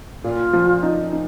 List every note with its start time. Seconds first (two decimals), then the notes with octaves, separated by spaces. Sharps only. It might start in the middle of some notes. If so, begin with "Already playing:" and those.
0.24 A#2 F4
0.53 F3
0.83 D#4
1.13 D#4